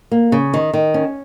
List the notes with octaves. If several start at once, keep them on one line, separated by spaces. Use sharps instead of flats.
A#3
C#3
D#3
D#3
C#4